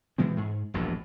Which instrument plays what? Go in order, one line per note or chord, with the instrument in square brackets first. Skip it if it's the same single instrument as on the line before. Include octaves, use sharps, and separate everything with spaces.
[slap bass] B2 E3 G#3 C4
G#2
E1 A#1 E2 G2